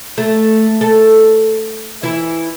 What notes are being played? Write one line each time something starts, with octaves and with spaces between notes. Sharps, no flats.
A3
A4
E3 E4